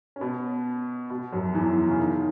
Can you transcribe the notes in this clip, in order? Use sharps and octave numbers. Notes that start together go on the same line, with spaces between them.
C#4
B2 B3
B2 B3
F#2 F#3
E2 E3
C#3
D#3